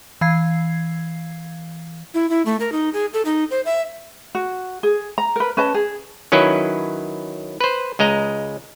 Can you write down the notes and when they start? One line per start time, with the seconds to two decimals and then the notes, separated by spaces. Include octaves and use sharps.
0.21 E3 F5 G#6 C7
2.14 E4
2.30 E4
2.46 A3
2.60 A#4
2.72 D#4
2.94 G#4
3.13 A4
3.25 D#4
3.51 C5
3.66 E5
4.35 F#4
4.83 G#4
5.18 A#5
5.36 A#4 B4
5.57 C#4 B4 D#5 A5
5.74 G#4
6.32 D#3 F#3 C#4 E4 B4
7.60 B4 C5
7.99 C#2 G#3 D#5 A#5